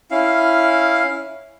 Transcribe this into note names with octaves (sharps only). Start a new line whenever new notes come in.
C#4 E4 F5